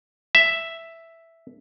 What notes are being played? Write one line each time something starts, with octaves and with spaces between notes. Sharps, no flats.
E5